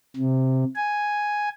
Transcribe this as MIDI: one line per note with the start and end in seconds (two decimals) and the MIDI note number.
0.17 0.64 48
0.75 1.49 80